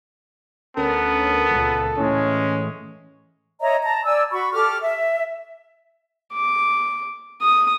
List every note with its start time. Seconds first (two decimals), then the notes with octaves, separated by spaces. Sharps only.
0.77 D2 B3 C#4 A4 A#4
1.51 C#2 A#2
1.98 A2 E3 G#3 C#4
3.60 C#5 D#5 E5 A#5
3.83 A5 A#5
4.04 D5 G#5 E6
4.31 F#4 B5 C#6
4.53 G4 A4 D6 F6
4.81 E5
6.33 D6
7.42 D#6